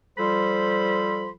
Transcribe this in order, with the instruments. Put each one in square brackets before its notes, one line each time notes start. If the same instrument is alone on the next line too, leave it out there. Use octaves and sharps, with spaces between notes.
[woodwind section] F3 G3 A4 C5 B5 C6